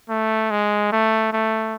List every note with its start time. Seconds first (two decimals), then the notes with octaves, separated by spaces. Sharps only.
0.09 A3
0.50 G#3
0.92 A3
1.33 A3